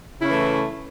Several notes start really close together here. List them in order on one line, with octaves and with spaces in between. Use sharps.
C#3 E4 C#4 E3 A3